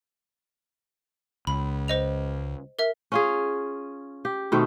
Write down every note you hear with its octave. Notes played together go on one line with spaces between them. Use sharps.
C#2 B5
C5 D#5 F7
A#4 E5
C#4 F4 G#4
G4
B2 D#3 A3 C4